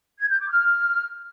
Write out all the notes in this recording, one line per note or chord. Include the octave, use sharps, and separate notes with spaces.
G#6
G6
D6
F6